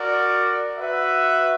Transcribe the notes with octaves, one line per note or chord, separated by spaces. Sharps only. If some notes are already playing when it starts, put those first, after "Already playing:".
Already playing: F#4 A#4 D5
F#4 B4 E5